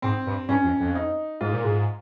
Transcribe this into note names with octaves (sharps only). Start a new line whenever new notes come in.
G#2 C4
G2
G2 C#4
F2
F2
D#4
G#2 F4
A#2
G#2